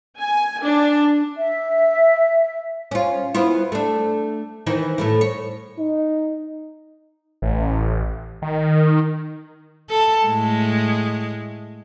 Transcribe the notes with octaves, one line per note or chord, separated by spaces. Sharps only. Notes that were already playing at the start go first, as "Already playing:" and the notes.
G#5
D4
E5
C#4 F4
B3 E4 F4
A3 D4
D#3 E3 D#4
A2 A3 E4
C#5
D#4
A1
D#3
A4
A2 G#3